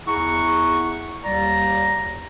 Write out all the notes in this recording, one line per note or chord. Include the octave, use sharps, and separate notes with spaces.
E2 E4 G#4 F#5 A#5 C#6
D#2 G3 D5 A#5